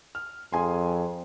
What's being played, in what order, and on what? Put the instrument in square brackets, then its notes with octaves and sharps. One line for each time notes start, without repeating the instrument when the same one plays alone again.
[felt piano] F6
[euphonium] F2 [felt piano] G#4 G#5 C6